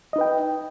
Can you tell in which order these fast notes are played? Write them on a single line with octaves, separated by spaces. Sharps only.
D#5 D#4 B4 G5